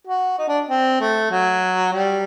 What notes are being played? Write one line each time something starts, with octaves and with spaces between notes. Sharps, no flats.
F#4
D#4
D4
C4
A3
F#3
G3